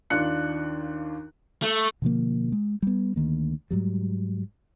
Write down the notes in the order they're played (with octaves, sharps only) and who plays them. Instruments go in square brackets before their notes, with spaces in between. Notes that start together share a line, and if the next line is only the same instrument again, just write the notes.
[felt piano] D#2 D#3 D4 F4 F#6 C#7
[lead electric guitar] A3
[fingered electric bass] B2 D3 F3 A#3
G#3
G3 B3
D2 D#3 A#3
G#2 F#3 G3